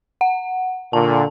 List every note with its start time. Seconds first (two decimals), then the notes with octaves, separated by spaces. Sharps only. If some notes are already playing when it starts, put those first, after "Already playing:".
0.21 F#5
0.93 A#2 D3 A5